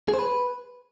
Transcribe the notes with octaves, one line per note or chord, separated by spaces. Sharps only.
G#4
C5
B4